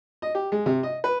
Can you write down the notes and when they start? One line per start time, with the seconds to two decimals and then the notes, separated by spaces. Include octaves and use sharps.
0.22 D#5
0.35 G4
0.52 G#3
0.66 C3
0.83 D#5
1.04 B4